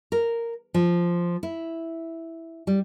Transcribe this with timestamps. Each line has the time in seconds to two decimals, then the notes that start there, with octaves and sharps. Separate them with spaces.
0.12 A#4
0.74 F3
1.43 E4
2.67 G3